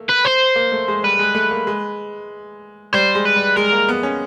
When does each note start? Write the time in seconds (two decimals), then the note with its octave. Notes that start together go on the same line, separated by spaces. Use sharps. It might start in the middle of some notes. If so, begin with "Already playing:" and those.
Already playing: A3 A#3
0.09 B4
0.25 C5
0.56 A#3
0.72 A3
0.88 G#3
1.03 G3 B4
1.19 G#3
1.35 A3
1.51 A#3
1.67 G#3
2.93 G3 C5
3.15 G#3
3.25 B4
3.36 G3
3.56 G#3 A#4
3.72 A#3
3.89 B3
4.03 C#4